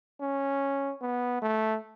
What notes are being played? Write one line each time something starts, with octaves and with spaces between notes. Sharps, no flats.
C#4
B3
A3